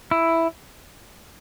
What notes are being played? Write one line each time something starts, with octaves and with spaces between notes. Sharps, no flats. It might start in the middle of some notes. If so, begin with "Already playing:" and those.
E4